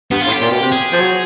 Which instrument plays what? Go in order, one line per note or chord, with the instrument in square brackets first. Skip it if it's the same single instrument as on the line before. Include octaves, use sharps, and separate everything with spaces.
[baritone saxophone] G2 [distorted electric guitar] B3
[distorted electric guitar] F4
[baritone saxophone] A2
[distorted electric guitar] G4
[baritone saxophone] A#2
B2
C3
[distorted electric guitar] G#4
[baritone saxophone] F3
F#3